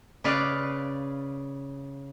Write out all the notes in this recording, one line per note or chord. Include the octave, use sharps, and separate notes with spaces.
C#3 B4 D5 F5